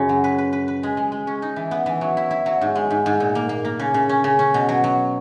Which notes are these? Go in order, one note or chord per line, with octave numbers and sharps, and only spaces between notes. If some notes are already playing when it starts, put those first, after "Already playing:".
Already playing: F#2 C#3
F#3
B4
B4
B4
B4
G#3
G#3
G#3
C#4
D#4
E3
B3
E3
F#3
E4
E4
F#3
G#2
G#3
G#2
G#2
A#2
A#3
A#3
A#3
C#3
C#3
C#4
C#3
C#4
B2
F#3
F#3